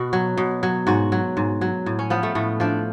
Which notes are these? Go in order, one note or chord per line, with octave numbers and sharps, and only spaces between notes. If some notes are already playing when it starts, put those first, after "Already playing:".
Already playing: B2 F#4
F#3
B2
F#3
G#2 F#4
F#3
G#2
F#3
A2
C#4
F3 B3
A3
A2 A3
F3 D4